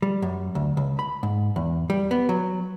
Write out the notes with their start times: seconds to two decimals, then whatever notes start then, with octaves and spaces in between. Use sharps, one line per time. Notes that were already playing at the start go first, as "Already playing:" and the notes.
0.02 G3
0.22 F#2
0.55 D2
0.77 C#2
0.99 B5
1.23 G#2
1.56 E2
1.90 G3
2.11 B3
2.29 F#3